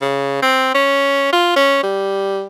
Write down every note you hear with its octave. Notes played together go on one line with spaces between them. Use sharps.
C#3
C4
C#4
F4
C#4
G3